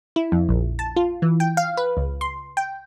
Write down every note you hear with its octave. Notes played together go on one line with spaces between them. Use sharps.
E4
F2
A#1
A5
F4
E3
G5
F5
B4
C#2
C6
G5